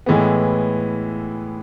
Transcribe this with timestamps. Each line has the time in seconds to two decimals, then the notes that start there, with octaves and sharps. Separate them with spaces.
0.06 A2 E3 G#3 B3